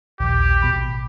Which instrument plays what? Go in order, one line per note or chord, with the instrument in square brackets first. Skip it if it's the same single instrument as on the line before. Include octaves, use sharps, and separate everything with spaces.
[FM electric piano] A#1 D#2 [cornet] G4
[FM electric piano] A1 B2 B5